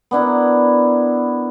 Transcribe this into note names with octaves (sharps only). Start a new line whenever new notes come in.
B3 D4 E4 A#4